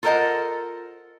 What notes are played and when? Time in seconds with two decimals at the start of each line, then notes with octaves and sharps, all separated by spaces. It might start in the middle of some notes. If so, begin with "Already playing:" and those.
0.03 F4 A4 A#4 C5 D#5 F#5